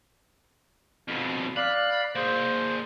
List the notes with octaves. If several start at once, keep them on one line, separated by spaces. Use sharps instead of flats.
F2 B2
D5 F5 B5 F#6
A#3 G#4 C5